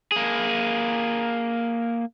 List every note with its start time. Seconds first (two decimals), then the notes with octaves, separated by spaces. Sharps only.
0.12 A#3 G#4